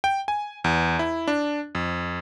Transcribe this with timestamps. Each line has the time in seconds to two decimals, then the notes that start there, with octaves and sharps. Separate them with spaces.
0.04 G5
0.28 G#5
0.64 E2
0.99 E4
1.28 D4
1.75 F2